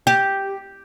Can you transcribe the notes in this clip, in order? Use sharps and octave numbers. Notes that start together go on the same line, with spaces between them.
G4